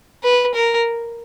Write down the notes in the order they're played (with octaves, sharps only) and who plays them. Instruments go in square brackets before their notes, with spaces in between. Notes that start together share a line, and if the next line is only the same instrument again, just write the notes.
[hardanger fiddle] B4
A#4